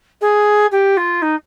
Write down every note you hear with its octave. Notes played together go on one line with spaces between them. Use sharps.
G#4
G4
F4
D#4